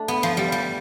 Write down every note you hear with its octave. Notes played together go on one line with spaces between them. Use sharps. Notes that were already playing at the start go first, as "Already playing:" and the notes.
Already playing: A3 D4
B3
F3
G3
G3